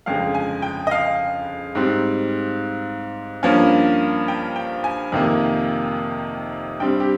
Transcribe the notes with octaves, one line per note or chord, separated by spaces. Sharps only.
G1 F2 C#3 G#3 F5
G#5
G5
D#5
F5
G#2 G3 C4
G2 F3 A#3 C#4
G5
G5
G#5
F2 C3 D#3 A#3
G2 G3 C4 G5
G4